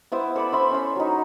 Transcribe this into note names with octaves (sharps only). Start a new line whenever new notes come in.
B3 E4 C5
A4 D5 B5
C5 E5 B5 C6
C#4 C6
F#3 D#4